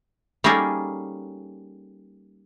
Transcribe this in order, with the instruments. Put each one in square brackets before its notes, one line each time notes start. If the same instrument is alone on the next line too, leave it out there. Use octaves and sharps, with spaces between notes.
[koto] G3 A#3 C#4 D#4 G#4 A4